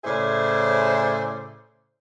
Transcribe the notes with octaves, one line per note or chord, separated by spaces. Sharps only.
A2 C#3 G#4 C5 D5 E5